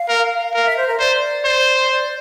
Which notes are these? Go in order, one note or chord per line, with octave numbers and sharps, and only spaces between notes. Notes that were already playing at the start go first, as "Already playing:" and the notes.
Already playing: F5
A#4
A#4 F5
E5
C5
A#4
C5 D5
C5
D5